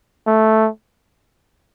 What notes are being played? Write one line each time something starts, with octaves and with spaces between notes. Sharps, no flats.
A3